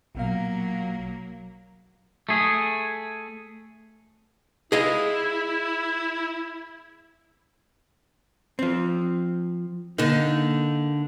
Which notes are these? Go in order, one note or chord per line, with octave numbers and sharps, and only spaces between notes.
A#1 B2 F#3 A#3 F5
A3 G#4
E4 G#4 D#5 F5
F3 C4
D3 A#3 D#4